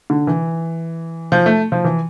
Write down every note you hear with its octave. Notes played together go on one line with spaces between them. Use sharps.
D3
E3
F3
A3
F3
E3